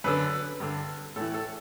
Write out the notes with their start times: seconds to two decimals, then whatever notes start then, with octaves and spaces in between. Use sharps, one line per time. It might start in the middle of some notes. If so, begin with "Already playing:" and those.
0.04 F#2 D3 B4
0.60 G2 D3
1.16 A2 A4
1.20 E3
1.34 A4